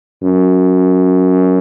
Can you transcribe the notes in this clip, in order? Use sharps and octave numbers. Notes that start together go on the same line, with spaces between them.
F#2